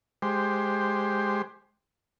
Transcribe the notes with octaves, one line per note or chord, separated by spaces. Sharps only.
G#3 G4 C5